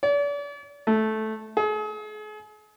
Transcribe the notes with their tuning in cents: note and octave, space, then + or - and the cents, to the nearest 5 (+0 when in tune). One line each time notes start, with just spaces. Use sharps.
D5 -40
A3 -10
G#4 +40